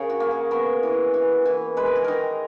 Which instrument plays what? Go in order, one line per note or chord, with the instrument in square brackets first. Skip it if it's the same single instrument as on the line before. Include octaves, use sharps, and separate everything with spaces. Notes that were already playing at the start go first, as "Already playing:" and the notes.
Already playing: [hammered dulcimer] C#3 G#4 A#4 C#5
F#4
A#3
G#4
B3 A#4
E3
E3
E3
G#3 B4
A#4
G#4
D#3 A#4